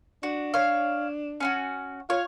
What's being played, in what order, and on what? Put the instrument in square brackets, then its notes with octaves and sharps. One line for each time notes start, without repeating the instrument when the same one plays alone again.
[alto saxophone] D4 [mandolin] F#4
[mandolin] C#5 F5
C#4 F4 F#4
[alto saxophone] F4 [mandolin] C#5